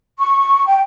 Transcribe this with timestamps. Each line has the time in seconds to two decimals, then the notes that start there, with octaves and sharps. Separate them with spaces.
0.18 C#6
0.67 G5